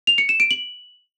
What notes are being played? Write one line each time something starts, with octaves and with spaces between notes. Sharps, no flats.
F7
C#7
E7
D7
F#7